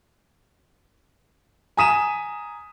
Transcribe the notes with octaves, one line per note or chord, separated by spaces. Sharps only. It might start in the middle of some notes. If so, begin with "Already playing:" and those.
G#5 A#5 D#6 B6 D#7 E7